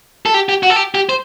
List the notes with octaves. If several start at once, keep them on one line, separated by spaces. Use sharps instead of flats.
A4
G4
G4
F#4
A4
G4
G4
C5